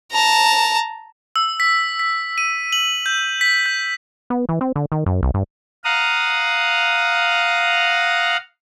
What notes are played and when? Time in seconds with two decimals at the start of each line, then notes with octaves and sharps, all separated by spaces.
0.12 A5 A#5
1.36 E6
1.60 B6
1.99 B6
2.38 D#7
2.73 F#7
3.06 G6
3.41 B6
3.66 G6
4.30 B3
4.49 E3
4.61 C4
4.76 D3
4.92 D#3
5.06 F#2
5.23 C2
5.34 G2
5.84 F5 F#5 A#5 D#6